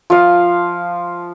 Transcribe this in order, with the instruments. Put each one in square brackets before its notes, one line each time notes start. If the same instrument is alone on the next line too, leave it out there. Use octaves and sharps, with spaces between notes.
[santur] F3 F5